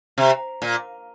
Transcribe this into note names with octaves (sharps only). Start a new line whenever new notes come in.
C3
A#2